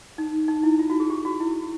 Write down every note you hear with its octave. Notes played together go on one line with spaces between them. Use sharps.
D#4
D#4
E4
F4
F#4
G#4
G4
F#4
E4